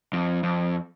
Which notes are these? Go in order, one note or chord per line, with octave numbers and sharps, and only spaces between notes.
F2
F2